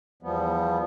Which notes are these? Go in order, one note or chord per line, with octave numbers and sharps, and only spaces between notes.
E2 F3 G3 B3